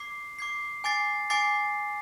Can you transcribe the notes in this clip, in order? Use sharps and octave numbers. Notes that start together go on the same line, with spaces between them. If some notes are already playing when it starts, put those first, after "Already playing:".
Already playing: D6 G#6 C7
D6 G#6 C7
G#5 D6 A6 C7
G#5 D6 A6 C7